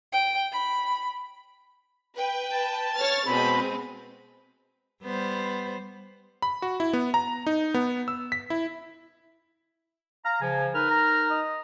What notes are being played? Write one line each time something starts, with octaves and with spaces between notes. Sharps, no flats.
G5
B5
B4 G5
A5
C#5 F6 A6
B2 G#3 C4 B5
G3 B3 C5
B5
F#4
E4
B3
A#5
D#4
B3
E6
B6
E4
F5 A#5
C#3 F3 G#5
D#4 A#4 B4 F6
A#5
D#5